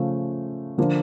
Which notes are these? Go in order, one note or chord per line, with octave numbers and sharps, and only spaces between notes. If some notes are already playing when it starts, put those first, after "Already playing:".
Already playing: C#3 F3 A3
D3 F3 A#3 D4 F4